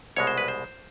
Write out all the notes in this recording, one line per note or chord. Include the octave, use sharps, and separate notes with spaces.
C2 B2 G#3 C#5
C5
B4
C5